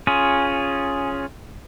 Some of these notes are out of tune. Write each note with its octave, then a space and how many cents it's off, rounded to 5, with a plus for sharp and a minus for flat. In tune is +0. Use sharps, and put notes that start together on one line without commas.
C#4 +0 F4 +0 G#4 +0